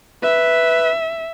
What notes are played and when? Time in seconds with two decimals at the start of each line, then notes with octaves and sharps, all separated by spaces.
0.23 B4 E5